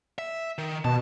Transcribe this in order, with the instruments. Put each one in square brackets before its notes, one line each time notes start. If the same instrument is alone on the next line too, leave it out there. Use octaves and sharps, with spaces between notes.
[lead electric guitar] E5
D#3
[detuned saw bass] B2 [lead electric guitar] A5